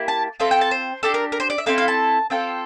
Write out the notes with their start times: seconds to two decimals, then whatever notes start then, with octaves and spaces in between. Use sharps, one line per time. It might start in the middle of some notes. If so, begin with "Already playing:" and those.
Already playing: A#3 E4 G4
0.08 A5
0.40 C4 F4 A4 E5
0.51 G5
0.61 A5
0.71 C5
1.03 D4 G4 A4
1.14 A#4
1.32 A#4
1.40 C5
1.50 D5
1.58 E5
1.66 C4 E4 A4 F5
1.78 F5
1.88 A5
2.30 C4 F4 A4 G5